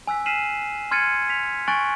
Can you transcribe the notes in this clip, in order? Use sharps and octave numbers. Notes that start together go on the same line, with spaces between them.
G#5 E6 F#6 B6
F6 B6 C7 D#7 E7 F#7
C6 F6 G#6 A6 C#7 D#7
B6 F7
G#5 C#6 F#6 A6 D7 F#7